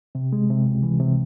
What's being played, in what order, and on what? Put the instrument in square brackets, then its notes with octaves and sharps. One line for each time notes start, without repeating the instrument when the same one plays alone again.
[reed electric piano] C3
G#3
C3
C#2
E3
C3